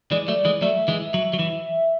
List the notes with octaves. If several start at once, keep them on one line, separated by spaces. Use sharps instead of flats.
E3 G#3 D5
F#3 A3
E3 G#3
F#3 A3 E5
E3 G#3
F#3
F#3
E3